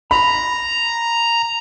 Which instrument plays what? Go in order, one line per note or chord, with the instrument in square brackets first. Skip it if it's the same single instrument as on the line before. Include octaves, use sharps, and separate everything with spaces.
[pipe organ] A#5 [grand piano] B5